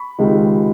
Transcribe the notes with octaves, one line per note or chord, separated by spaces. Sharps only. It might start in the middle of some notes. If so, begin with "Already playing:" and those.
Already playing: B5 C#6
C#2 C3 D#3 G#3